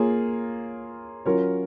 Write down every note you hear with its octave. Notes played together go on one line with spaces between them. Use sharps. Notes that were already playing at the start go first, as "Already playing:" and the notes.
Already playing: A#3 F4 G#4 C#5
F#3 C#4 F4 A#4 C#5